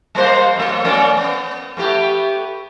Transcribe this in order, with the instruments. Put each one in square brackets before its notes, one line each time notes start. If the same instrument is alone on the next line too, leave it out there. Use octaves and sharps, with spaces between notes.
[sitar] G3 A#3 C5
F#2 A3
A3 C#4 D5
B3
A3 B3 G4